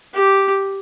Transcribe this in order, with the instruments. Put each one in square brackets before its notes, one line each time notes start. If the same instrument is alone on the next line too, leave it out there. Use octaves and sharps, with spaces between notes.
[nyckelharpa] G4